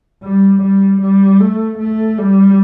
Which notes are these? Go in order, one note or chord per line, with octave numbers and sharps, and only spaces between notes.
G3
G3
G3
A3
A3
G3